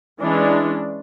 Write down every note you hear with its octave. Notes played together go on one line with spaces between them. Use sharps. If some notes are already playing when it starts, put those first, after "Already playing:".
E3 G#3 C#4 D4